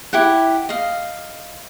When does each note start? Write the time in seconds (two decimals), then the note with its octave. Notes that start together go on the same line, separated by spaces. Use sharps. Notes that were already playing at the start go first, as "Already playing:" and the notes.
0.13 E4 G4 F#5
0.69 D#5 F5